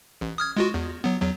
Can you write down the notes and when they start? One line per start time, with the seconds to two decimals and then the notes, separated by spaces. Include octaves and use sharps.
0.21 A1
0.38 D#6 F6 G#6
0.57 G#3 F4 F#4
0.74 E2
1.04 F#3 B3
1.22 E2 F#3